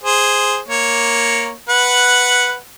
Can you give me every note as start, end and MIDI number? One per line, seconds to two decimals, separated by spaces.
0.03 0.59 68
0.03 0.59 72
0.68 1.52 58
0.68 1.52 73
1.69 2.57 71
1.69 2.57 78